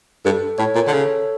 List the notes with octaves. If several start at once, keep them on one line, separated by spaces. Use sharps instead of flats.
G2 A4
A2 C#5
A#2
D3
C#3 A4